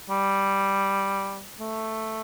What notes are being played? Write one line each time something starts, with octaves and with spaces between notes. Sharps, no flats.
G3
A3